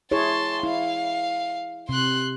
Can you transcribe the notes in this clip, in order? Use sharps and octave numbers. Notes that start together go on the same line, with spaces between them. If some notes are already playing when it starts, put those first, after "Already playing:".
E4 G#4 C#5 A5 C6
E4 F5
C3 C6 F#6